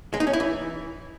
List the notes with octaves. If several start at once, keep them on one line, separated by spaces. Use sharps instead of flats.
G#3
D#4
C#4
E4
E3